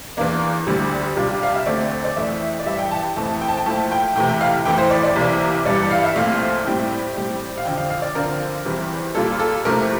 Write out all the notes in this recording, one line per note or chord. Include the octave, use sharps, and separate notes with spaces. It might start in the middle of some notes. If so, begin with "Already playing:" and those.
E2 E3 A#3 D4
D2 D3 G3
C3 G3 D4 F4
F5
E5
D2 D3 A3 C4 D5
D5
F2 E3 A3 E5
D5
G2 E3 G3 E5
G5
A5
G5
F2 E3 A3 C4 E4 A5
G5
A5
G5
A#2 F3 A3 E4 A5
G5
C3 E3 A3 E4 G5
G5
F5
F2 E3 A3 E4 G5
C5
D5
D5
C2 C3 E3 A#3
G2 E3 G3 D5
F5
E5
C2 A#2 F3 A3 C4 F5
A2 G3 C4 E4 G5
A2 G3 C4
F5
F2 D3 F3 G5
F5
F5
D5
D3 F3 C4 F4 A#4
E2 E3 G3 C4 E4
A#2 G3 A#3 F4 A4
A4
C3 F3 A3 E4 A#4